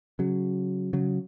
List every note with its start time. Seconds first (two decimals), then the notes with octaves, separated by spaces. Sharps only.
0.19 C#3 F#3
0.93 C#3 F#3